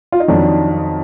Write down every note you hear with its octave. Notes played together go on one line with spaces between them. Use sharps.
F4
D#4
F2 D#3 F#3 D4